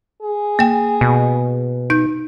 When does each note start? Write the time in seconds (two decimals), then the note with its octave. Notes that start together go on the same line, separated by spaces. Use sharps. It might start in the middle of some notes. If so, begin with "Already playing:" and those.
0.22 G#4
0.59 A#3 G5
1.01 B2
1.90 D#4 G6